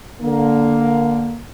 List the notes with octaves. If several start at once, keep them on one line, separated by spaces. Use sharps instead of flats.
D3 A#3